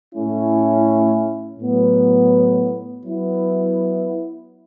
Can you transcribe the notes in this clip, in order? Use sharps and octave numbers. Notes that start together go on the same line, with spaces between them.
A2 A3 C#4 E4
A2 F#3 B3
F#3 B3 E4